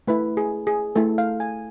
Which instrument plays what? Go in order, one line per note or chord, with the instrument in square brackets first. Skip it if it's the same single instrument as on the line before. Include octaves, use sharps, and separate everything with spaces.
[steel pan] A3 E4 B4
G#4
G#4
A3 E4 A4
F5
G#5